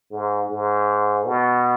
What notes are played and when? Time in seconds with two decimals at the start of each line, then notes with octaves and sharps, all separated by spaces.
0.12 G#2
0.50 G#2
1.26 B2